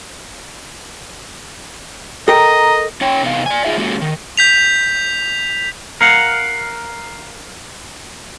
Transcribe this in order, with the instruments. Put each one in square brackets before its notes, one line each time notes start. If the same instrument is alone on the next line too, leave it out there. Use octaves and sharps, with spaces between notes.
[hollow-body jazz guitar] A4 A#4 G5 [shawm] D#5 [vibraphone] A#5
[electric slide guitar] C#4 C#5 G5
C3 B3 D#4 F5
D5 G#5
D#4 F4 G#4 E5
G#3 A#3 C#4 F#4 G4 A4
D#3
[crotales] G6 B6 F7
[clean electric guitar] A#4 F5 F#5